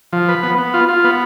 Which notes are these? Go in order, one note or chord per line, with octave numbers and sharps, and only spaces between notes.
F3
B4
B3
B3
F4
F4
B3